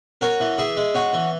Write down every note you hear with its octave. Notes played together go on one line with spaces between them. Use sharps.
C#4 F#4 A#4
E3
E4 G#4
G#3
C#4 F#4
E3